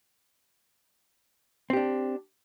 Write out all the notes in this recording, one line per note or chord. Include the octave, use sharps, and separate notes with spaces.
C4 D4 G4